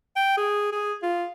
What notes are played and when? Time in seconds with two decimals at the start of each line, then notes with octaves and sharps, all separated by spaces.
0.16 G5
0.37 G#4
0.72 G#4
1.03 F4